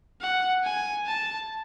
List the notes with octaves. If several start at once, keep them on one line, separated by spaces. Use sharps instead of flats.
F#5
G#5
A5